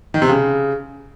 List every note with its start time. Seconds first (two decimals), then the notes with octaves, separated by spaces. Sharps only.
0.14 D#3
0.22 C3
0.29 C#3